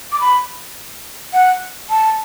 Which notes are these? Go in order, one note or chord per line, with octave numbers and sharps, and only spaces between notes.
D6
B5
F#5
A5